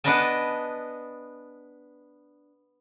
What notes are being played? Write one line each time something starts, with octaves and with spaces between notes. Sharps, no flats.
B3 D4 B4 D#5 G#5 A5